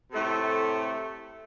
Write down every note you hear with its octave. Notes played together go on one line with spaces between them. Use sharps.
A2 C3 A3 A4